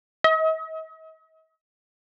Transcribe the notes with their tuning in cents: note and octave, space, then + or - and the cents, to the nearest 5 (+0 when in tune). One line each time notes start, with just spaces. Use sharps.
D#5 +40